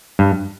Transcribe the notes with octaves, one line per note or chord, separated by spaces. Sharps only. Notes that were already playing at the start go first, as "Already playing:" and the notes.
G2